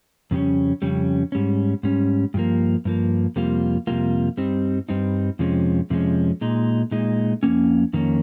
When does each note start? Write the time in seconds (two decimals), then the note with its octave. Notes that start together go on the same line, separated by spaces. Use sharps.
0.31 F2 C#3 G3 C#4
0.82 F2 C#3 G3 C#4
1.32 G#2 G3 C#4
1.83 G#2 G3 C#4
2.34 G2 F3 A#3
2.85 G2 F3 A#3
3.36 F2 C3 G3 A#3 F4
3.87 F2 C3 G3 A#3 F4
4.37 G2 G3 C4 D#4
4.89 G2 G3 C4 D#4
5.39 F2 C3 F3 G#3 C#4
5.90 F2 C3 F3 G#3 C#4
6.41 A#2 G#3 D#4
6.91 A#2 G#3 D#4
7.43 F2 D#3 A#3 C#4
7.93 F2 D#3 A#3 C#4